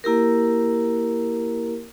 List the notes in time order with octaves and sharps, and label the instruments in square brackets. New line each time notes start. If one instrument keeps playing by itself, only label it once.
[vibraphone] A#3 E4 G4 A#4